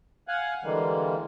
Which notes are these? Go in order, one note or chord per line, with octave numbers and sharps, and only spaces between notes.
F5 F#5 G#5
D3 E3 G3 G#3 A#3